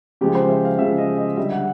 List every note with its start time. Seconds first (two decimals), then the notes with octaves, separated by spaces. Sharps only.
0.21 C#3 F3 G#3 G4
0.35 C5
0.49 E5
0.65 F5
0.79 C#3 F3 G#3 E5
0.98 D#5
1.18 D#5
1.37 D3 G3 E5
1.52 F#5